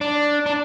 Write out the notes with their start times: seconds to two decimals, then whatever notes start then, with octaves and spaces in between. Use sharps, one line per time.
0.01 D4
0.46 D4